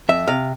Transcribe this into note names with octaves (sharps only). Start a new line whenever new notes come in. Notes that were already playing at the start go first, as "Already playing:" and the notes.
F2 E5
C3 F5